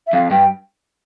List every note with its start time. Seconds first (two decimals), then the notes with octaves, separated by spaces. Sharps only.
0.07 E5
0.13 F2 F5
0.30 G2 G5